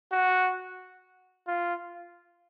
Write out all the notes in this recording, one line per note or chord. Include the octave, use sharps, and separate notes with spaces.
F#4
F4